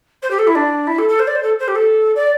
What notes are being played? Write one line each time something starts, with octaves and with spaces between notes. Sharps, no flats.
C5
G4
A4
E4
D4
E4
A4
A4
C5
D5
C5
A4
C5
G4
A4
D5